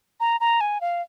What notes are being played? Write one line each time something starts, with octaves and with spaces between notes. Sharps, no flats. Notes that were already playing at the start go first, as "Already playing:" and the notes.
A#5
A#5
G#5
F5